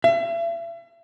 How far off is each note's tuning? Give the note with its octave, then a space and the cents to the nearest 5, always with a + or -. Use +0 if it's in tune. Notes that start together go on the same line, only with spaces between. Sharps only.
E5 +40